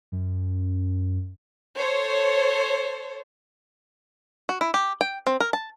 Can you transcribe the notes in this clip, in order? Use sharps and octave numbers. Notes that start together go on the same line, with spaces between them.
F#2
A4 C5 C#5
F#4
E4
G4
G5
C4
A#4
A5